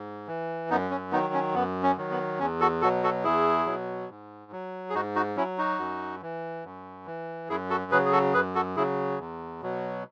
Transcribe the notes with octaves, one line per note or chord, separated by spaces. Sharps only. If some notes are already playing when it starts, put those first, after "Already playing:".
Already playing: G#2
E3
F#2 B3 D#4
C#4
D#3 F#3 B3 D#4
C#4
F#2 B3
C#4
D#3 F#3
B3
E2 C#4
F#4 A4
B2 F#3 F#4 A4
F#4 A4
E2 E4 G#4
B2 F#3
G#2
F#3
G#4
G#2 D#4 F#4
D#4 F#4
F#3 C#4 E4
D#4 F#4
F#2
E3
F#2
E3
F#2 E4 G#4
F#4 A4
C#3 F#3 G#4 B4
G#4
F#4 A4
F#2 G#4 B4
F#4 A4
C#3 F#3 E4 G#4
E2
B2 F#3